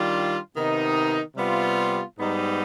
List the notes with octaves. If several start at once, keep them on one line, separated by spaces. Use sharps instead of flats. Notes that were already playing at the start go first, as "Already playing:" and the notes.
Already playing: D#3 G3 D4 F4
C3 D#3 B3 D#4
C3 G3 B3 F4
G#2 G3 B3 D#4